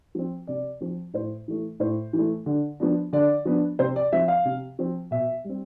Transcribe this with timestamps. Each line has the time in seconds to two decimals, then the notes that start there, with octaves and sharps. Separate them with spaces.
0.15 F3 C4
0.47 C3 D5
0.81 F3 C4
1.14 A2 C5
1.48 E3 A3
1.80 A2 C5
2.13 E3
2.18 A3
2.46 D3
2.80 F3 B3 D4
3.13 D3 D5
3.45 F3 B3 D4
3.79 C3 C5
3.96 D5
4.12 F3 C4 E5
4.28 F5
4.45 C3
4.79 F3 C4
5.11 B2 E5
5.44 G3 C4